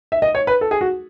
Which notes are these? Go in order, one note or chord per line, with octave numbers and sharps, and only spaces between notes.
E5
D#5
C#5
B4
A4
G#4
F#4